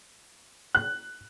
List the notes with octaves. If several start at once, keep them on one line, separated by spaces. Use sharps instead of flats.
F#6